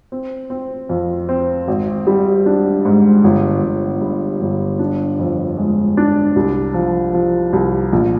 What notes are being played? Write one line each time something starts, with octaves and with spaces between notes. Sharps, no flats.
C4
C4
F2
C4
G#1
G3
D4
G#2
G1
G1
G2
G1
D4
F2
G#3
D4
C2
F3
F3
C2
A#1